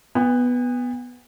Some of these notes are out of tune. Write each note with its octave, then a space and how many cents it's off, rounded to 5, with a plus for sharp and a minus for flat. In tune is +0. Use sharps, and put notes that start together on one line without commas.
B3 +0 G#5 -45